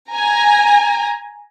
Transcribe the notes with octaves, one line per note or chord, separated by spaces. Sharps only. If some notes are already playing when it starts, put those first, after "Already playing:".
G#5 A#5